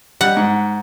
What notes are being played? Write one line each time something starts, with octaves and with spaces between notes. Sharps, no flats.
G3 F#5
G#2